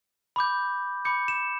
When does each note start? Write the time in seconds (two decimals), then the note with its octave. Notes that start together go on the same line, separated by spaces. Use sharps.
0.36 B5 D6 G6
1.05 B5 D6 G6 C#7
1.28 E7